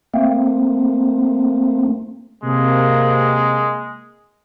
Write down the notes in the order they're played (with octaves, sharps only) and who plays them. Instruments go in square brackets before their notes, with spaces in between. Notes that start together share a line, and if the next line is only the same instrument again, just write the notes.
[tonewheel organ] A3 A#3 C4
[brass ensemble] C3 A#3 [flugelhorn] G#3